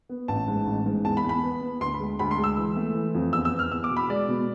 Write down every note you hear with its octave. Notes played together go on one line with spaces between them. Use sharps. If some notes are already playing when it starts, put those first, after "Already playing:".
B3
A1 A5
G#2
A1
G#2
E2 A5
B5
E2
B5
B3
B3
D2 C6
B5
G#3
D2 B5
C6
G#3
E6
E3
A3
E3
F2
E2 E6
E6
B3
F6
E2 E6
D6
B2
B5
G#3 D5
B2